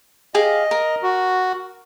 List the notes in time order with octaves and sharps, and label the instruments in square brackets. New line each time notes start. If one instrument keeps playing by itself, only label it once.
[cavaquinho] G4 G#4 F5 [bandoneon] D#5
[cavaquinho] A#4
[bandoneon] F#4